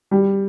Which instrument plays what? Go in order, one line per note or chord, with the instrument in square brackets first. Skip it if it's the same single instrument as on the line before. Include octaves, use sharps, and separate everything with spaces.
[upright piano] G3